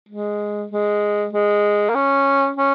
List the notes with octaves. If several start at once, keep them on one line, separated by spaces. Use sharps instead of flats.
G#3
G#3
G#3
A#3
C#4
C#4